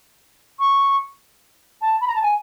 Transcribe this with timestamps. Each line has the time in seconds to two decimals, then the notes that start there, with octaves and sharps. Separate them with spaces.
0.59 C#6
1.81 A5
2.00 B5
2.07 A#5
2.15 A5
2.22 G#5